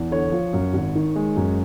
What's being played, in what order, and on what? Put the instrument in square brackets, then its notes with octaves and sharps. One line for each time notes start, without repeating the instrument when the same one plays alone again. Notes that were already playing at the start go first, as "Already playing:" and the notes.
Already playing: [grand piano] E2
D3 C#5
F3
F#2
G#1
D#3
G#3
F#2